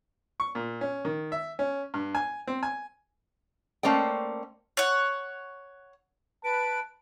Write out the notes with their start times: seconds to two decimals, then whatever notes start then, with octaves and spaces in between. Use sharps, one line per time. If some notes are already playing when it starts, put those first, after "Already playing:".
0.40 C#6
0.55 A#2
0.81 C#4
1.05 D#3
1.32 E5
1.59 C#4
1.94 G2
2.15 G#5
2.47 C4
2.63 G#5
3.83 A3 A#3 C#4 C5 D5 G5
4.77 C#5 F#5
6.44 B4 A5 D7